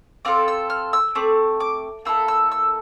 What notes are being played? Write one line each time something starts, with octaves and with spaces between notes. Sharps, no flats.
C4 F4 A4 D6
E6
F6
E6
A3 C4 D6
D6
A#3 E4 A4 E6
E6
E6